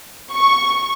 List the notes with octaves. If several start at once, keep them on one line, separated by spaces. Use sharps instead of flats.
C#6